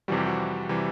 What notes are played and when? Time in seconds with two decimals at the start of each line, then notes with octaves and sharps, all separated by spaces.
0.08 F2 C3 E3 G3 F#4
0.17 G4
0.26 F#4
0.69 C3 E3 G3